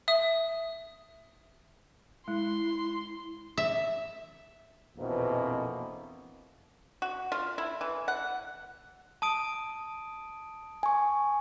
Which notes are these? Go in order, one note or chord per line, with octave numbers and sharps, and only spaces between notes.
E5 D#6
G#3 E4 C6
E5
A#1 F2 B2 E3 A#3 C4
F#4
F4
E4
E3
F#5
A5 D#6 D7
G#5 C#6